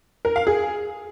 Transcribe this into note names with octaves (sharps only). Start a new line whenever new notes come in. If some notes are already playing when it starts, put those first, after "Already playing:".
A#4
F5
G#4